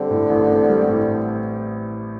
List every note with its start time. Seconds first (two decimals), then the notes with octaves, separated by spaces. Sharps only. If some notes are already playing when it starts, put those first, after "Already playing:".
Already playing: D3 G3 C4
0.10 A2
0.30 A1
0.49 C4
0.69 G3
0.89 A2